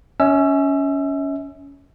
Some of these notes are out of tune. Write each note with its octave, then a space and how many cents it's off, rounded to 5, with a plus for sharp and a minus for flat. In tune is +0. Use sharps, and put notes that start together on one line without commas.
C#4 +15 E5 -40 E6 +30